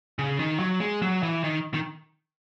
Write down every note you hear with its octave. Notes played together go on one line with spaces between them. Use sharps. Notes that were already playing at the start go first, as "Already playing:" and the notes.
C#3
D#3
F#3
G#3
F#3
E3
D#3
D#3